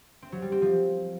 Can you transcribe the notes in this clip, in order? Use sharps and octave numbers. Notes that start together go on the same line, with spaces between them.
C4
F#3
G3
C4
F3